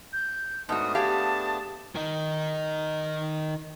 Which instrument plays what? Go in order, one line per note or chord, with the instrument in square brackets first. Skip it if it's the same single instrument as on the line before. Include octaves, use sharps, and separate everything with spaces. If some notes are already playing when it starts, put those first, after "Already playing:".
[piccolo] G6
[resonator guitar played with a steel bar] G#2 F#4 [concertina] A3 B3 D4 [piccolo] D#6
[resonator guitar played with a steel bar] G4 G#4 F5 [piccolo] A5
[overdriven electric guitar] D#3 D#4